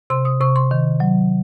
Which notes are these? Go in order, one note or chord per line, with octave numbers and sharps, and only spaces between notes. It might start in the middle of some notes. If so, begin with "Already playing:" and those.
C3 C6
D#6
C3 C#6
C6
D#3
F#3